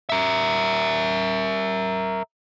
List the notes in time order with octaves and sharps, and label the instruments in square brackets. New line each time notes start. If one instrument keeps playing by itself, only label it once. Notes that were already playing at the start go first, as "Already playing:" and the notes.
[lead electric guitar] A#4 E5